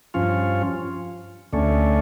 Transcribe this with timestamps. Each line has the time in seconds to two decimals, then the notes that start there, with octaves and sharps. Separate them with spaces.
0.14 G2 F3 C#4 F4
1.53 D2 D3 A3 C#4